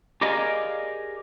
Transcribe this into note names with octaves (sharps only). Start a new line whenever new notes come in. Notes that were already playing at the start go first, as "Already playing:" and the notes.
G4 G#4 A#4 D5 D#5 F5